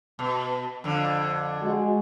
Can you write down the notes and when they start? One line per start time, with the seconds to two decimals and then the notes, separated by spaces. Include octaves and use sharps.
0.19 B2
0.84 F2 D3
1.61 G#3 F#4